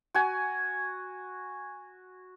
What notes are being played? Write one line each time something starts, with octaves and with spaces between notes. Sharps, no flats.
F#4 G#5